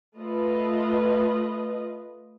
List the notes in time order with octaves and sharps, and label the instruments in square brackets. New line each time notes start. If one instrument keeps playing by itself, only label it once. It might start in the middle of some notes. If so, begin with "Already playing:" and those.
[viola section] A3 F4 B4 D#5